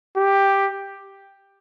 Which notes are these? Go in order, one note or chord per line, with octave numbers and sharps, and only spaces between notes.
G4